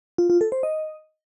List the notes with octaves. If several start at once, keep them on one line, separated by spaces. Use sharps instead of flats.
F4
F4
A4
C5
D#5